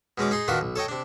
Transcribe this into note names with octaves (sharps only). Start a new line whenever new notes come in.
B2 G#3 C#4 D6
D#4 G#4 C6
D#3 D4 F4 F#4 B4
B1
A4 C#5 D#5 G5
C3 D4